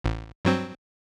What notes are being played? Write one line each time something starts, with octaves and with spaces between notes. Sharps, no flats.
A1
G2 F#3 C4